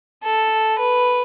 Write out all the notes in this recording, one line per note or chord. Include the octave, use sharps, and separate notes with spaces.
A4
B4